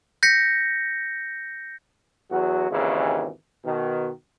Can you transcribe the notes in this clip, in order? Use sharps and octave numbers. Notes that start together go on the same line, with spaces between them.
G6 A#6 B6 C#7
E2 F#3 F#4
G#1 D#2 C#3 E3
B2 D#3